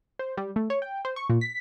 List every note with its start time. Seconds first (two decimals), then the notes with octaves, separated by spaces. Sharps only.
0.19 C5
0.37 G3
0.56 A3
0.70 C#5
0.82 G5
1.05 C5
1.16 C#6
1.30 A#2
1.41 B6